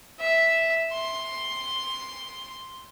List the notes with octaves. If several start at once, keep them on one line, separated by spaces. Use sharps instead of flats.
E5
C6